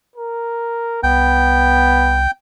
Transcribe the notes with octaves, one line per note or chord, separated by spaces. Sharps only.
A#4
C2 B3 G5